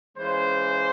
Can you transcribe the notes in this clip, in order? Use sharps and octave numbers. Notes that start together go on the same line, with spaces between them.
E3 G#3 C#4 F4 C5